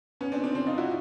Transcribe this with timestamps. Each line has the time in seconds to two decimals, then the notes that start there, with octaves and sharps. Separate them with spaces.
0.21 B3 C#4
0.32 C4 D4
0.43 C4 D4
0.55 C4 D4
0.66 D#4 F4
0.78 E4 F#4